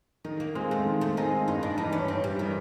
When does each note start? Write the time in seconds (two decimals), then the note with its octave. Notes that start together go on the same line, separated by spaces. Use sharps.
0.25 D#3 D#4
0.40 A#3
0.55 G#3 A#3 C4 F4 G#4
0.71 A3
0.86 D#3
1.01 A3
1.17 G#3 C4 D#4 F4 G#4
1.48 G2 D#4
1.63 D4
1.78 E3 G3 D#4
1.93 C#4
2.08 G2 C4
2.24 G3
2.39 D#3 E3 G3